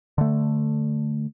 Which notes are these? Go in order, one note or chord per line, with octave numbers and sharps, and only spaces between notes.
D3 A3